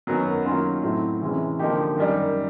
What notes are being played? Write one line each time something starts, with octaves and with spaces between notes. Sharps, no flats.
F#2 D#3 F#3 B3
D#3 F#3 A#3 C#4 F4
A2 F#3 A3 C4 E4
C3 E3 G#3 C#4 E4
D3 F3 A#3 D#4 G4
F#2 D#3 G3